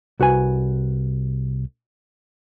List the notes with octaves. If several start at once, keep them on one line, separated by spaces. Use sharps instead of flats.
C2 F#4 B4 G#5